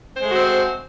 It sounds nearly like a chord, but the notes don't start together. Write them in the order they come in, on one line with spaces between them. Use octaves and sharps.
C5 G#3 A3 F#4 C4